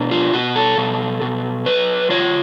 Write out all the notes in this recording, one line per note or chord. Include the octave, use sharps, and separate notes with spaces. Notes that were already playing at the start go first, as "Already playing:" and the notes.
Already playing: B2 D4
F4
B2 F#4
A4
B2
B2
F#3 B4
F4 C#5